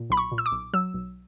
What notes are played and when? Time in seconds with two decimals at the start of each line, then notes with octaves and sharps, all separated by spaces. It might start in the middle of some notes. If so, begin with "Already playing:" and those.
Already playing: A#2
0.10 B1 B5
0.17 C#6
0.32 A#2
0.38 E6
0.46 D6
0.52 B1
0.73 F#3 E6
0.94 B1